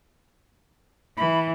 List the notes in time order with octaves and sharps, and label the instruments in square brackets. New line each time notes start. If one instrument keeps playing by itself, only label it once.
[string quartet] E3 [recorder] B5